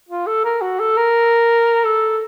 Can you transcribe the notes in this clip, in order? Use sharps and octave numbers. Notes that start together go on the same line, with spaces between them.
F4
A4
A#4
F#4
A4
A#4
A4